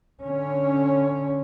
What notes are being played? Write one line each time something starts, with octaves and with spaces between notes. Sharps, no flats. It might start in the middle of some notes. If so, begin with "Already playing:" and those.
D3 C#4